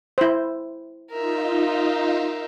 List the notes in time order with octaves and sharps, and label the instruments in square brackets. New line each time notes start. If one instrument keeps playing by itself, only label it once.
[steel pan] E4 C5
[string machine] D#4 F4 [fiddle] A#4 E5